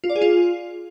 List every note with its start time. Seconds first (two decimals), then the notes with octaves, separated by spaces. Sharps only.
0.04 F4
0.10 D5
0.16 G#4
0.22 F4